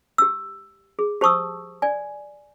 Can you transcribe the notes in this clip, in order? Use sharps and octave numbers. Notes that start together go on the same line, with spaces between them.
G4 E6
G#4
G4 C5 A5 C#6 D#6 E6
D5 G#5